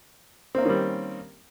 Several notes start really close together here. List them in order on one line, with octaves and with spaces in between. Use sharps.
C4 A#3 C#4 D#3 G3